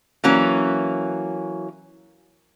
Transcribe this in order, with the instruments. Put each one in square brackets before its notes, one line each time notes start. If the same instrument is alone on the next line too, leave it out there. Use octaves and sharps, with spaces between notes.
[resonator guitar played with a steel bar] E3 F#3 A#3 C#4